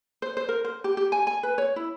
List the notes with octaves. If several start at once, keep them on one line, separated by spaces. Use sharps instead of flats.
C5
C5
A#4
C5
G4
G4
G#5
G#5
B4
C#5
E4